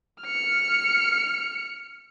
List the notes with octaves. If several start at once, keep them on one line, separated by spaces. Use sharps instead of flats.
F6 C#7